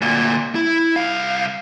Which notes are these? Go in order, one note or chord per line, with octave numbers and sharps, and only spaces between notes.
D2 A#2
E4
C2 F5